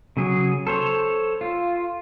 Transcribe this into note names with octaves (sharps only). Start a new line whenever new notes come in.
C#3 F#3 G#4
A4 C5 C#5
F4